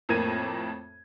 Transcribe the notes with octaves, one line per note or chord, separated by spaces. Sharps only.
F2 A2 A#3 G#6 D#7